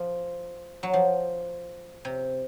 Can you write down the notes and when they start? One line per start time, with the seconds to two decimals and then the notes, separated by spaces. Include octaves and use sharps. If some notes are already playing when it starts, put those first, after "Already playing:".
Already playing: F3
0.83 F#3
0.93 F3
2.05 C3